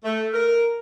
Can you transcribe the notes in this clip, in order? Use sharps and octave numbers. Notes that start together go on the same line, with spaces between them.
A3
A#4